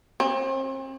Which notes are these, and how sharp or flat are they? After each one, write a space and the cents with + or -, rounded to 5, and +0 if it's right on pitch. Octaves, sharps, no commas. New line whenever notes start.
C4 +40